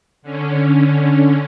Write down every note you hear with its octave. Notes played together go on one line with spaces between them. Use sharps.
D3 C#4